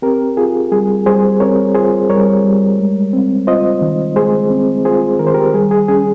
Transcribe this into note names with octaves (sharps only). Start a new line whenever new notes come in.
C4 G4 A#4
F4 G#4
G3 G#4
G3 G#4 C5
C4 A#4 C#5
F4 G#4 C5
G3 A#4 C#5
G3
G#3
C4
F4 C5 D#5
D#3
G#3 G#4 C5
C4
F4 G#4 C5
D#3 A#4
C5
G4 A#4
G3 G#4
G#4
C#4 G#4